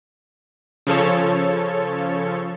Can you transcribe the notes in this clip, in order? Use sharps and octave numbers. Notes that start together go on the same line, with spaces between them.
C#3 F3 A4 C#5